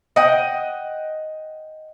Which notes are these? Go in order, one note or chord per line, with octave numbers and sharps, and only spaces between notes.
D#5 F#5 G5